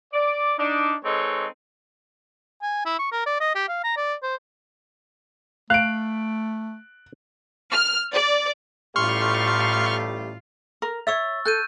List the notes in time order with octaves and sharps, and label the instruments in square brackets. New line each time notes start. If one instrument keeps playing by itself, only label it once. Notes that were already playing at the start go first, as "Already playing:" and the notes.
[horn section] D5
D4 D#4
G#3 C4 D#4 A4 B4 C#5
[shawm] G#5
E4
C#6
A#4
D5
D#5
G4
F5
A#5
D5
C5
[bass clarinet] A3 [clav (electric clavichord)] F5 [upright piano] F#6 D7
[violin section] F6
D5
[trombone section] A1 G3 A3 [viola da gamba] A2 F4 [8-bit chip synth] C6 C#6 F6
[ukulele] A#4
[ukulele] C#5 E5 [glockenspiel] C#6 E6 A6
[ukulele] A4 [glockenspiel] F#6 G6 D#7